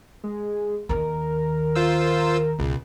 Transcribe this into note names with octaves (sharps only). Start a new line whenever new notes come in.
G#3
D#2 D#3 A#4
F4 C5 E6
C#2 B2